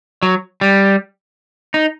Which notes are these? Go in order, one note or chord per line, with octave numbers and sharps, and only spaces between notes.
F#3
G3
D#4